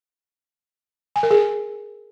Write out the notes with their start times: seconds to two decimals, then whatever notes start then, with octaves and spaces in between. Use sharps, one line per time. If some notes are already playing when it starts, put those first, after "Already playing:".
1.16 G#5
1.23 A#4
1.31 G#4